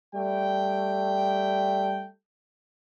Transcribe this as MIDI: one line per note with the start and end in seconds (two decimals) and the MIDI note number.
0.15 2.06 55
0.15 2.06 57
0.15 2.06 79